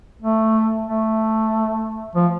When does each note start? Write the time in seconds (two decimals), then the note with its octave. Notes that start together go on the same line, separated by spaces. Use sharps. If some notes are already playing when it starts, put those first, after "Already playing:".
0.22 A3
0.86 A3
2.15 F3